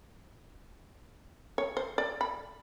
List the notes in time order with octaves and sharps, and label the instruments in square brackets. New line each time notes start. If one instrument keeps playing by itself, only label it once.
[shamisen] C#5
C5
D5
B5